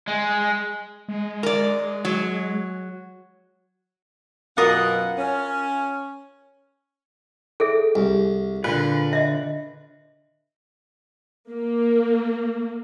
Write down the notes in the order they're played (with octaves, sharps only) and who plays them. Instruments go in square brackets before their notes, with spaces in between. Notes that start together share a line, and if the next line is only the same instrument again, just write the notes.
[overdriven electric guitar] G#3
[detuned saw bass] G#3
[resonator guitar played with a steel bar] A#4 D5
F#3
[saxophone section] F#2 B2 F#5 [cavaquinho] F4 A#4 D#6
[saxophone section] C#4
[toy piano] G#4 A4 E5
[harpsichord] C2
[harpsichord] A#2 [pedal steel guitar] D3 B4
[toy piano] D#5 E5
[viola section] A#3